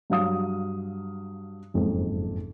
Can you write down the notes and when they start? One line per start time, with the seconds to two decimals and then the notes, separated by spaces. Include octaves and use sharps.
0.10 G2 F#3 F5 D#6
1.74 F#1 F2 G#2